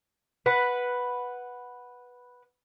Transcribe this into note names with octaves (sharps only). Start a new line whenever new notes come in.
B4 F#5